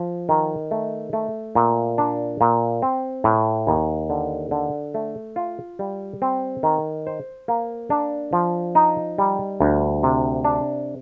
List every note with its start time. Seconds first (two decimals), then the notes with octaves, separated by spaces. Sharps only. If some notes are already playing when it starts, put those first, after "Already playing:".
Already playing: F3
0.29 D#3
0.71 A3
1.13 A3
1.55 A#2
1.98 D4
2.41 A#2
2.82 C4
3.24 A2
3.67 D#2
4.10 D3
4.51 D3
4.94 A3
5.36 F4
5.79 G3
6.22 C4
6.63 D#3
7.07 C5
7.48 A#3
7.90 D4
8.33 F3
8.75 D#4
9.18 G3
9.60 D2
10.03 C3
10.45 D4